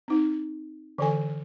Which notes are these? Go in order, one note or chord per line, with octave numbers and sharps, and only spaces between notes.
C4 D#4
D3 E3 A4 G#5